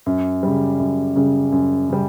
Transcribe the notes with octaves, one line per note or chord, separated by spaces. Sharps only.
F#2
C#3 G3
F#2
C#3 G3
F#2
C#3 G3